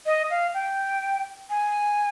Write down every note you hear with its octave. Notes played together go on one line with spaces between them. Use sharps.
D#5
F5
G5
G#5